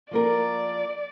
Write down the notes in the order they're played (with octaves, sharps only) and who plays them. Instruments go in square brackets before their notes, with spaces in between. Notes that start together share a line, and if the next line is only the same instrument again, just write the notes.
[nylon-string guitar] F3 A#3 A#4 [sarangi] D5